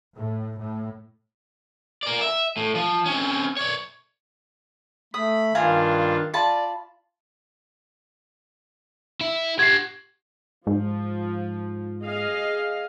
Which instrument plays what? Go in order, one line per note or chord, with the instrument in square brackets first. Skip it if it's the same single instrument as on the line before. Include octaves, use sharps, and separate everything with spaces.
[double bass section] A2
A2
[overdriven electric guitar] A#4 D5
E5
A2
F3
C4 C#4
C#5 D5
[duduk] A3 [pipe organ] B5 [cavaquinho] D#6
[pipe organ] G2 D4 F4 [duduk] D#3 [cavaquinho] F5 G#5 A#5
[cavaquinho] F4 A5 B5 [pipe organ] D5
[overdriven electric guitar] E4 E5
[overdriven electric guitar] G4 F#5 [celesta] G#6 C7
[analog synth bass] G#2 [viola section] F3
[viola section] G#4 D#5 F5